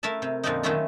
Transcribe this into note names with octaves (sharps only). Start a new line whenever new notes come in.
A3 E4 A#4 E5 A5
C3
F2 A#2 D3 F3 C4 D#4
D#3 F#3 A3 C#4 E4 F4